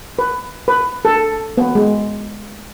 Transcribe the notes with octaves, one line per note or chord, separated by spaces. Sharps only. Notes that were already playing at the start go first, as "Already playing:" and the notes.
B4
B4
A4
B3
G#3